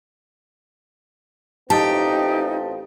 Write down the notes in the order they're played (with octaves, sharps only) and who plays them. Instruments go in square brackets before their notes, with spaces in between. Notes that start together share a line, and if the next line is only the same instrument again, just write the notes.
[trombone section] A1 C4 F4 [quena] D#4 [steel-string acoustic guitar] G4 [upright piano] A5